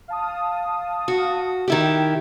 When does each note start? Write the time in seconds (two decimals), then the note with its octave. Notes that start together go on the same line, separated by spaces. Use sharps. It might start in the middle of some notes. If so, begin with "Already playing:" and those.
0.08 F5 A5 D#6
1.08 F#4
1.68 D#3 E4 G4